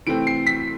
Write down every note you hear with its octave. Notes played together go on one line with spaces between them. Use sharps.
C3 E3 A3 C4 D7
C7
B6